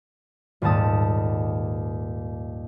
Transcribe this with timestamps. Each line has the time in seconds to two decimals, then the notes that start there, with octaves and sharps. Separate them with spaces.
0.62 D#1 D#2 G#2 A5 D#6